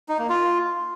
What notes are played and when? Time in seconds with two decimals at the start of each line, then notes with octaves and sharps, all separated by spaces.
0.09 D#4
0.19 A#3
0.29 F4